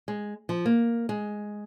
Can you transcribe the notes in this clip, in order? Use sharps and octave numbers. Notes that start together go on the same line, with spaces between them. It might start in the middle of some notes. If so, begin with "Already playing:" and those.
G#3
F3
A#3
G#3